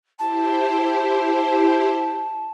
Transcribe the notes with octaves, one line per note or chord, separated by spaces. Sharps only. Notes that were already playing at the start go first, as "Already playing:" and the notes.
E4 G4 C5 A5